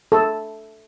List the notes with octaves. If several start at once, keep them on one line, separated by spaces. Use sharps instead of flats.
A4